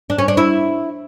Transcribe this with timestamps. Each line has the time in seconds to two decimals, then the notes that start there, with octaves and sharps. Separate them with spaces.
0.10 D4
0.18 C#4
0.28 D4
0.37 E4